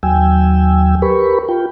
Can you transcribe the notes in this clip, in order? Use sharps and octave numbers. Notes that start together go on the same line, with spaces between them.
D#2 F#3 G5 G#5 E6
G4 A#4 B4 B5 C#6
F4 G5